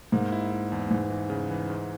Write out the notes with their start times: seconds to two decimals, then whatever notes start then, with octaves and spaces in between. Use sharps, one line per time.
0.12 G#2 A#3
0.32 E4
0.52 E4
0.72 E2
0.91 G#2 E3
1.10 E3
1.30 C#3
1.50 E3
1.70 G#2